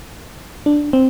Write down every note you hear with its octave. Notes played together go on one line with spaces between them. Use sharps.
D4
C4